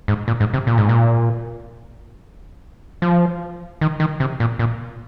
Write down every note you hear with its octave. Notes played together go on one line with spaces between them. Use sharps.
G#2
A#2
G#2
C3
A#2
G#2
A#2
F3
D#3
D#3
C3
A#2
A#2